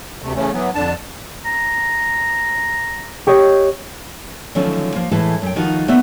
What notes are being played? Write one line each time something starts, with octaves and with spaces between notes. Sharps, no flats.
D2 C3 A3
C#3 E3 A3 C#4
E3 F#3 B3
F2 D3 D4 A5
A#5
G4 C#5 D#5
D3 D#3 F3 F#3 A3 C#4
F3 A#3
A2 E3 G#3 A3 A5
F#2 G5
D#3 F3 D#4 F#4
A3 B3 C4 D#4 D5 E5